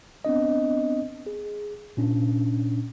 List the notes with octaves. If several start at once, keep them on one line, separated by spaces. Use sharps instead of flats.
B3 C4 D4 D#5
G#4
A#2 C#4 D4